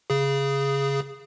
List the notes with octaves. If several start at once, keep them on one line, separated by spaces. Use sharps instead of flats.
C#3 G#4